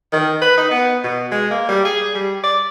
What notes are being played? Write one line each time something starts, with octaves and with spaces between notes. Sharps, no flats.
D#3
B4
D#4
B3
B2
G#3
A#3
G3
G#4
G3
D5